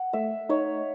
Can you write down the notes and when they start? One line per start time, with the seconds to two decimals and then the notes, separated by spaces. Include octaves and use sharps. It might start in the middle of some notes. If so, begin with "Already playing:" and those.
Already playing: F#5
0.13 A3 E5
0.49 D#4 C#5